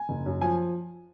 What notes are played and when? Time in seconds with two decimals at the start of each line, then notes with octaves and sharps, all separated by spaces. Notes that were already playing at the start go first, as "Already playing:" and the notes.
Already playing: G#5
0.09 F#1
0.26 F#2
0.41 F3 G#5